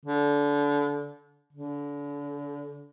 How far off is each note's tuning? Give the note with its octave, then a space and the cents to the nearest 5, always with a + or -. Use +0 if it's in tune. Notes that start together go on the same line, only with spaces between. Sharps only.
D3 -25
D3 -35